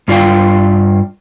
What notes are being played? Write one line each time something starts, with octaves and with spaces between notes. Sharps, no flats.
G2 F4 D5 F5 G5